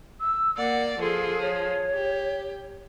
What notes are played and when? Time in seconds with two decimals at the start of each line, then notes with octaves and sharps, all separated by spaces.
0.20 E6
0.57 A#3 D5 F#5
0.99 F3 G#4 A4
1.40 C#5
1.94 G4